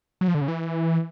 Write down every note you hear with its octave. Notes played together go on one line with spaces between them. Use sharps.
F#3
F3
D3
C#3
E3